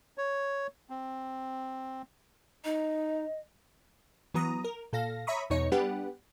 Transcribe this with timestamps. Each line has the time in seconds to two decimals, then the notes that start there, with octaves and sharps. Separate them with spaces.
0.18 C#5
0.90 C4
2.64 D#4 D#5
4.34 E3 F#3 B3 A#5 D#6
4.64 A#4
4.93 A#2 A4 F5 A#6
5.27 C#5 E5 A#5 B5 C#6 D#6
5.50 E2 B2 D#4 C#5 C#7
5.71 G3 B3 D4 G4 B4 F#5